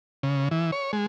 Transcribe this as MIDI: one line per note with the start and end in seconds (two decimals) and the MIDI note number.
0.23 0.49 49
0.51 0.71 52
0.72 0.92 73
0.93 1.06 56